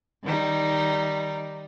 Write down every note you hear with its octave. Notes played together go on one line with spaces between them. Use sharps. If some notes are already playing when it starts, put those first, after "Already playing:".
D#3 G3 D#4